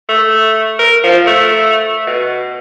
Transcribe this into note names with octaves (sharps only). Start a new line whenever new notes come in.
A3
A#4
F3
A3
B2